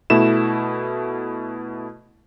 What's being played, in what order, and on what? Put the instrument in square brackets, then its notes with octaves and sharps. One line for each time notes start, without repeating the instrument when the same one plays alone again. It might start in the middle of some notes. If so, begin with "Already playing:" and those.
[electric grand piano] B2 A3 E4 E7